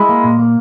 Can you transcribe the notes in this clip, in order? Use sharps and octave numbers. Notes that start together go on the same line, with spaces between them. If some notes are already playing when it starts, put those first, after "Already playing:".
Already playing: G#3 E4
A#3
A#2
A#3